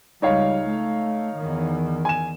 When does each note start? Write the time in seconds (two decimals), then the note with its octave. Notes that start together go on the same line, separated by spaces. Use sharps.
0.22 C#2 G3 D#4 C#5 F5
0.67 A3
1.37 E2 D#3
2.05 G#5 E7